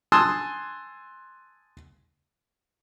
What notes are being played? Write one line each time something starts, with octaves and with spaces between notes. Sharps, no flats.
G#5 A5 C6 D#6 E6 F#6